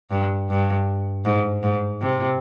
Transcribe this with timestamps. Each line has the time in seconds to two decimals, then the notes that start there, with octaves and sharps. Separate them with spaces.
0.11 G2
0.50 G2
1.25 G#2
1.63 G#2
2.01 C3